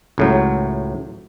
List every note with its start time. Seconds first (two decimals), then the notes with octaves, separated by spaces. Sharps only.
0.18 C#2 A2 F#3